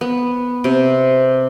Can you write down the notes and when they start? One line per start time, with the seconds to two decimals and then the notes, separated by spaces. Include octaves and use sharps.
0.01 B3
0.64 C3